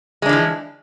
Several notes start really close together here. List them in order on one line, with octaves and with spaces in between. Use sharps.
G#3 D4 F3 E3